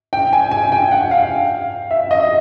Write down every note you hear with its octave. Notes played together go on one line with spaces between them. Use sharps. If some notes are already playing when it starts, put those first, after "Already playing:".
G5
G#5
G#5
G5
F#5
F5
E5
D#5